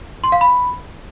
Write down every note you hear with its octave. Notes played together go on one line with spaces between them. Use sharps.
C6
F5
B5